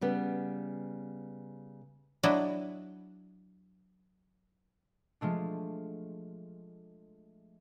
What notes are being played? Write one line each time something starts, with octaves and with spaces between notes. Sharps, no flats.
C#3 G3 B3
F#3 D4 E4 D#5
F3 G#3 A3 D4